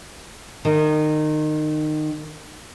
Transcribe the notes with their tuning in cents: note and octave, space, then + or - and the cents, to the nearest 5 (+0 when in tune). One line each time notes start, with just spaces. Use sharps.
D#3 -25